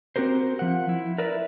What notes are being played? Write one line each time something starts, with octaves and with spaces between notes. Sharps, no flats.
C4 F#4 G4 A#4 C5
F3 F#5
E4
A#4 B4 D5 E5